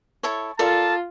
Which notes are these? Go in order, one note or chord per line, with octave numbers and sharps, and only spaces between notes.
E4 A4 C#5
F4 A4 A#4 D5 A5